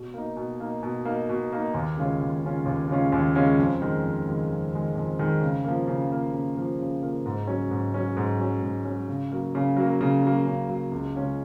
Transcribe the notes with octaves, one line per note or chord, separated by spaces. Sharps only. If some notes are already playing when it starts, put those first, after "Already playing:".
Already playing: B2
A#3 D#4
B2
A#3 D#4
B2
A#3 D#4
B2
A#3 D#4
D#2
C#3 G#3 C#4 F4
D#2
C#3 G#3 C#4 F4
D#2
C#3 G#3 C#4 F4
D#2
C#3 G#3 C#4 F4
F2
D#3 G#3
F2
D#3 G#3
F2
D#3 G#3
F2
D#3 G#3
C#3
F3 A#3
C#3
F3 A#3
C#3
F3 A#3
C#3
F3 A#3
G#2
F#3 C#4
G#2
F#3 C#4
G#2
F#3 C#4
G#2
F#3 C#4
C#3
F#3 A#3
C#3
F#3 A#3
C#3
F#3 A#3
C#3
F#3 A#3
C#2
C#3 G#3 C#4 F4